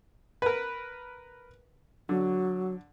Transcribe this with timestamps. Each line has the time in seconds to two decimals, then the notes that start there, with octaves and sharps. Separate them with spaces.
0.42 A#4 B4
2.09 D3 F#3